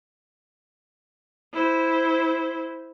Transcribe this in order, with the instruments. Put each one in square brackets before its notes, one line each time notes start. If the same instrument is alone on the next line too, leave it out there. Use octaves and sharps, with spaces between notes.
[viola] E4 C5